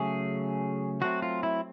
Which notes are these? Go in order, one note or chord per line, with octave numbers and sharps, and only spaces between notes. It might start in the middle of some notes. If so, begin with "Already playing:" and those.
Already playing: C#3 F#3 A3 C#4 G#4
F#3 A3 C4 F#4
F4
E4